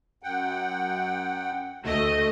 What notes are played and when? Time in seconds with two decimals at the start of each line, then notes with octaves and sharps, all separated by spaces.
0.23 F#2 F#5 G5
1.84 D2 A3 D#5